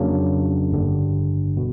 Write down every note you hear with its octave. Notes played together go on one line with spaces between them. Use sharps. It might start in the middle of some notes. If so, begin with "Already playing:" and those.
Already playing: F2 C#3 F#3 A#3 D4
G#1 G2 D3 G3
B2